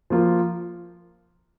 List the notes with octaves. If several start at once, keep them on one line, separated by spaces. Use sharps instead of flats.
F3 A#3 F4